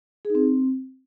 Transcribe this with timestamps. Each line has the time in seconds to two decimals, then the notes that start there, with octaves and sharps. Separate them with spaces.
0.25 G#4
0.30 D#4
0.35 C4